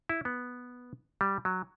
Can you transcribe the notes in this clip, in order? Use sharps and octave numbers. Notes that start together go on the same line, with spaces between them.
E4
B3
G3
F#3